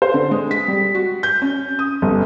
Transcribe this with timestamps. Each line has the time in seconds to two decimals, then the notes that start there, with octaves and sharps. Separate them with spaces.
0.02 C5
0.14 D3
0.31 G#3
0.51 B6
0.68 G3
0.95 F#4
1.23 G6
1.42 C#4
1.79 D#6
2.02 G1